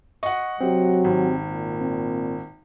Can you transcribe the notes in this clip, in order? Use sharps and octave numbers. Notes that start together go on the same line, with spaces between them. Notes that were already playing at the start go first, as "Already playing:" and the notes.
D#5 F#5 C#6
F#3 C4 G4
G#1
A#2
C4